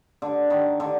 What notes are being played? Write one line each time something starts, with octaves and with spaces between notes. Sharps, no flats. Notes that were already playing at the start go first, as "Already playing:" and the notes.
D3
D#3
D3